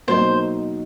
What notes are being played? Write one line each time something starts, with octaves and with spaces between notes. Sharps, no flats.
B2 F#3 A#3 D#4 C5